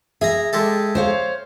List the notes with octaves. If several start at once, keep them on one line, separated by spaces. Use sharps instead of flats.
G#4 E5 A#5
G#3 G4 A4
C5 C#5 F5